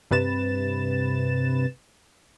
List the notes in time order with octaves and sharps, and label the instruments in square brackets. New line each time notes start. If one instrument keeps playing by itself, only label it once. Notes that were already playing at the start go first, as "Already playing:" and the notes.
[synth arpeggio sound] G2 C3 B4 A6 E7